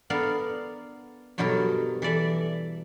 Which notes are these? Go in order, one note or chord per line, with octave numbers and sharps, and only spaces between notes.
B3 D4 A4 A#4 F5
G2 B2 F#3 B3 A4 A#4
E3 A4 D5 E5